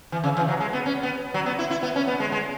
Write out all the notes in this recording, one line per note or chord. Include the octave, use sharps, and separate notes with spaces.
E3
C#3
E3
F#3
G#3
B3
C#4
B3
F#3
B3
E4
E4
B3
C#4
B3
G#3
G#3